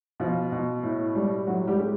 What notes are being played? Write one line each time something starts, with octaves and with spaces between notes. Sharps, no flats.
B2 F3 F4
B2
A2
G3
A2 F#3 F#4
G3 G4
G#3